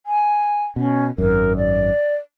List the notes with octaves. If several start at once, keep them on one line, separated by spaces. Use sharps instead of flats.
G#5
B2 C#4
G#1 F#2 A#4
D5